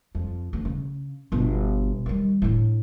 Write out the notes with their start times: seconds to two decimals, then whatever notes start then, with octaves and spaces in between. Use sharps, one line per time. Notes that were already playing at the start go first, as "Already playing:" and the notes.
0.15 F2
0.53 D2
0.65 C#3
1.32 G1 B2
2.06 D#3 G3
2.42 A2 D3